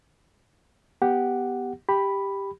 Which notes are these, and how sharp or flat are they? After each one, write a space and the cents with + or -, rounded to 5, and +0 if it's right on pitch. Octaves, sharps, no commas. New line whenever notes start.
B3 +0 G4 +0 F#5 +0
G4 +5 B5 +0